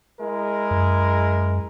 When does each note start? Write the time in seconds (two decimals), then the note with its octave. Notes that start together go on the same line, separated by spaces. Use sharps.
0.19 G#3 E4 A#4
0.71 F#2